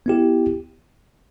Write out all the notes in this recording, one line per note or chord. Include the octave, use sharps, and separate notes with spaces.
B3 E4 G4